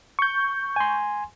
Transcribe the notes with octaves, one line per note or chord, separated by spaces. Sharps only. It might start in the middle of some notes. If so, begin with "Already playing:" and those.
C#6 G6
G#5 C6